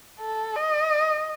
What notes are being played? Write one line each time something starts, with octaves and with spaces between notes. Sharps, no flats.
A4
D#5